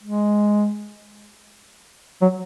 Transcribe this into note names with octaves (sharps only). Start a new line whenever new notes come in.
G#3
F#3